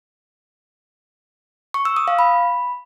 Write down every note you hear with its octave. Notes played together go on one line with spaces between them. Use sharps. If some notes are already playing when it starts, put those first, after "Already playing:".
C#6
E6
D#6
F5
B5